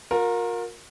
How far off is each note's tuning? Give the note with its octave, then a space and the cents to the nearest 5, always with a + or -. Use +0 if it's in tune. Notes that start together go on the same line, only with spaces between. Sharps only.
F4 +45 A#4 +0